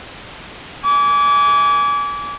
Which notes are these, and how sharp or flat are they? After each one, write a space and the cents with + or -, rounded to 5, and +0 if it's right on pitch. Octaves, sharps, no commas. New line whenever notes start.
G#5 +0 D6 -30